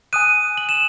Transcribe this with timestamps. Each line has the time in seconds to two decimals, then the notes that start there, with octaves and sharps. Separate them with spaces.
0.13 G#5 D#6 F#6 D#7
0.58 F#7
0.69 E7